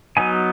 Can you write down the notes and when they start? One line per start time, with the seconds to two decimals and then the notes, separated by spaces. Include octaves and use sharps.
0.17 F#3 B3 D#4 G#5